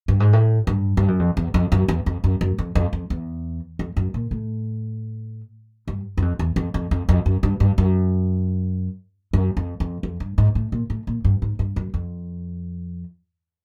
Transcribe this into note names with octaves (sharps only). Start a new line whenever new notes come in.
G2
G#2
A2
G2
G2
F#2
F2
E2
F2
F#2
E2
F2
F#2
F#2
F2
F2
F2
E2
F2
F#2
A#2
A2
G2
F#2
F2
E2
F2
F2
F2
F2
F#2
G2
G2
F#2
F#2
F2
F2
F2
G2
G#2
A2
A#2
A2
A#2
G2
G#2
G2
F#2
F2